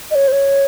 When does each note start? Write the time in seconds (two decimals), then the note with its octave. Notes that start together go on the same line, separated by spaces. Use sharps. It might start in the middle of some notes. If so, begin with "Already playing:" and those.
0.11 D#5
0.15 C#5
0.28 C5
0.32 C#5